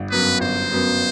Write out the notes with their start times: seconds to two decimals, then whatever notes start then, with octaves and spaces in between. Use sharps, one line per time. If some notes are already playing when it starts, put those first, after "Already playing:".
Already playing: G1
0.11 F#2 F#3 B3 B4
0.40 G1 C5
0.71 F#2 F#3 B3